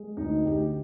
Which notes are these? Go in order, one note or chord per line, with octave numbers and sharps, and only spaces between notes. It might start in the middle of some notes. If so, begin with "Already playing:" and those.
Already playing: G#3
D2 D#4
D2 G4